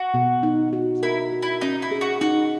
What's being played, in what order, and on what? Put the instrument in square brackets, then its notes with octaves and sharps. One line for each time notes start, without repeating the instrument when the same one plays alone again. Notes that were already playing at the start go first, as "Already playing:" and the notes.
Already playing: [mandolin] F#4
[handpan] B2
D#4
F#4
[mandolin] E4 [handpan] A#4
[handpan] F#4
[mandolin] E4
[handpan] C#4 [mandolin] D#4
[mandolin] E4
[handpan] G#4
[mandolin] F#4
[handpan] D#4 [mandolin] F#4